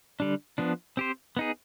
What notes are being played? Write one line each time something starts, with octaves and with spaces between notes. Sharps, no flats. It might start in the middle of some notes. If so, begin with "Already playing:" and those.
D3 G3 D4
F3 B3 D4
C4 G4 C5
B3 D#4 G#4